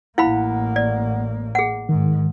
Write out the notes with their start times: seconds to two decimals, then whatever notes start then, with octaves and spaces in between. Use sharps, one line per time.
0.18 A1 A#3 E4 F5 F#5 B5
0.76 D5
1.55 G#4 F#5
1.89 G#2 D#3